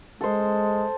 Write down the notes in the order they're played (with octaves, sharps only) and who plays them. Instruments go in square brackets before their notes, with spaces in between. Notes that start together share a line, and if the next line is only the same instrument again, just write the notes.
[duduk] G#3 [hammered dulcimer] A4 C5